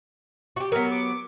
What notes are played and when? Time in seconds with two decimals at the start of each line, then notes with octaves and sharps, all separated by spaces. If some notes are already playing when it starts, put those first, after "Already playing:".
0.56 F#4 G4
0.72 F#3 B3 A#4
0.91 D6